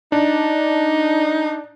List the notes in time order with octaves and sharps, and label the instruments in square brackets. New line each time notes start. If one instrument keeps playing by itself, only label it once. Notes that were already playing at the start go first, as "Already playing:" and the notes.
[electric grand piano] D4 [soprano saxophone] D#4